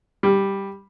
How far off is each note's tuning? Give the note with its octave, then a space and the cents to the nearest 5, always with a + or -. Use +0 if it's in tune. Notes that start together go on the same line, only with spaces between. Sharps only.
G3 +5